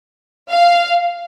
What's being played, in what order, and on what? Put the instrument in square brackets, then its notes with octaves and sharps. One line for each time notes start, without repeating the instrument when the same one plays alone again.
[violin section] F5